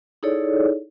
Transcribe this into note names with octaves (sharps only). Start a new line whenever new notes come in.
D#4 E4 G#4 A4 C#5 D5